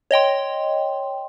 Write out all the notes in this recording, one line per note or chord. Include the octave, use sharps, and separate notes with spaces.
C#5 D#5 G5 C6